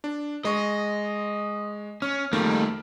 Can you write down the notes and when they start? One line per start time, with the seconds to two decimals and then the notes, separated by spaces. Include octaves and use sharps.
0.04 D4
0.45 G#3 D#5 C#6
2.02 C#4 F6
2.33 F2 D#3 G3 A3 A#3